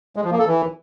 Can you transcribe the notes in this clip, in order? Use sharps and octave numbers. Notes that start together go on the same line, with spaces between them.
G#3
F3
A#3
A4
E3